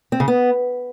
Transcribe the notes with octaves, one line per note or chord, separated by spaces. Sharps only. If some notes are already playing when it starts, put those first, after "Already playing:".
C4
C#3
B3